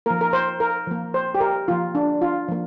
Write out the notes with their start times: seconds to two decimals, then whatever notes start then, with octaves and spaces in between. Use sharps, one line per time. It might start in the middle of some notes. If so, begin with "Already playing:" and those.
0.06 F3 A#3 A#4
0.21 A#4
0.33 C5
0.60 A#4
0.87 F3 A#3
1.14 C5
1.35 G4
1.40 A#4
1.68 F3 A#3 F4
1.95 D4
2.22 F4
2.48 F3 A#3